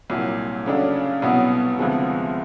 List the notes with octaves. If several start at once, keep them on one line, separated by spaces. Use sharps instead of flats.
C2 A#2 F#3
C#3 F#3 A3 D4
C2 B2 F#3 B3
D2 C3 F3 G#3 B3